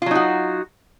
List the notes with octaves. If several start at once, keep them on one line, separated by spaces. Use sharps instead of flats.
F#3 D#4 F4 F#4